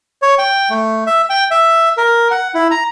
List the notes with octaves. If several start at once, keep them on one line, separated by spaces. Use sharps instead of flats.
C#5
G5
A3
E5
G5
E5
A#4
F#5
E4
A#5